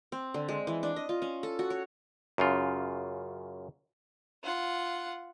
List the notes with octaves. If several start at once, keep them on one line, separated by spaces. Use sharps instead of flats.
C4
D3
G#3
E3
D4
D#5
F4
C#4
A4
F#4
C#5
F#2 C#3 F4
F4 F#5